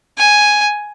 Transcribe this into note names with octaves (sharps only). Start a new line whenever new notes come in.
G#5